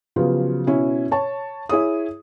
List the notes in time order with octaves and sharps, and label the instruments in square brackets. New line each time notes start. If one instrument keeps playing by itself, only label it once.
[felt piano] C#3 F3 F#3 B3 F4 G4
B2 C#4 E4
C#5 A5 C#6
E4 G#4 C#5 D#6